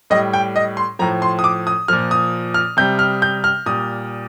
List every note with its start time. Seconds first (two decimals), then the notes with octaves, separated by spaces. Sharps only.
0.10 A2 G3 D#5
0.33 G5
0.56 D#5
0.77 C6
0.99 A2 F3 A#5
1.22 C6
1.39 D#6
1.44 D6
1.67 D#6
1.88 A#2 F3 F6
2.11 D#6
2.54 F6
2.77 C3 G3 G6
2.99 F6
3.22 G6
3.44 F6
3.66 A#2 G3 D#6